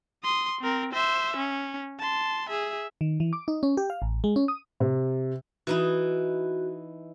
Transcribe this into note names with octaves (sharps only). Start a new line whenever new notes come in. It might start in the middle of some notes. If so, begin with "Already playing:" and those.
C6 D#6
C4 A#4
C5 E5
C#4
A5 C6
G#4 E5
D#3
E3
D6
D#4
C#4
G4
F5
A1
G#3
C#4
D#6
C3
E3 D#4 E4 F#4